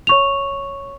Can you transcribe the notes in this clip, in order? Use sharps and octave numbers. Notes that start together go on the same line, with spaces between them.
C#5 C#6 F7